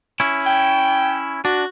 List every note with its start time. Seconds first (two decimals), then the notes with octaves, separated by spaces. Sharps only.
0.20 C#4 E4
0.46 G5
1.45 D4 F#4